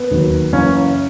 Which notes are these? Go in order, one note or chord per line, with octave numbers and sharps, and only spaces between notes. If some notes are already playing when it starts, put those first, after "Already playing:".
Already playing: B3
E1 D#2 D#3 F#3
F#1 F#2 E3 C#4